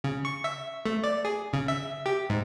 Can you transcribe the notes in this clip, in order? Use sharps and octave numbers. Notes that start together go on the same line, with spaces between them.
C#3
C#6
E5
A3
D5
G#4
C#3
E5
G4
G#2